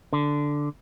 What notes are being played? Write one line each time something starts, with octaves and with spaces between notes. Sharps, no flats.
D3